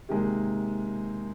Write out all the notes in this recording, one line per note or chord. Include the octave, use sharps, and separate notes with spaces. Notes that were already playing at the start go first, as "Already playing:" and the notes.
C3 D#3 G#3 A#3